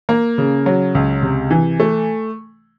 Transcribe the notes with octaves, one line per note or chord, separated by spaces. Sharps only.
A#3
C#3
F#3
C#2
C3
E3
A3